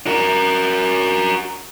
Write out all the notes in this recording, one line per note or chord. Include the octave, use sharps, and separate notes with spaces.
F#4 A#4